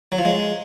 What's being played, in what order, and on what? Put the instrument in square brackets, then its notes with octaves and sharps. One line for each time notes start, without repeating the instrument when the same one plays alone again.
[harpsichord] F#3
F3
G#3